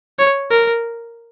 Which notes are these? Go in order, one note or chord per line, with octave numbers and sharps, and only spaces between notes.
C#5
A#4